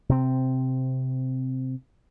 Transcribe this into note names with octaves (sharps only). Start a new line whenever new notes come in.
C3 C4